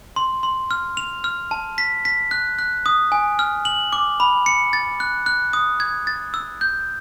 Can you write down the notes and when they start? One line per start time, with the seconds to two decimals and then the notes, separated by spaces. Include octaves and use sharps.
0.16 C6
0.43 C6
0.71 F6
0.97 F7
1.24 F6
1.51 A5
1.78 B6
2.05 B6
2.31 F#6
2.59 F#6
2.86 D#6
3.12 G#5
3.39 F6
3.65 F#7
3.93 D6
4.20 B5
4.46 C#7
4.73 A6
5.00 F#6
5.26 F#6
5.53 D#6
5.80 G#6
6.07 A6
6.34 E6
6.61 G6